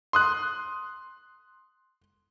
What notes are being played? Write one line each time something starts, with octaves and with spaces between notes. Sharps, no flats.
C6 D#6 F#6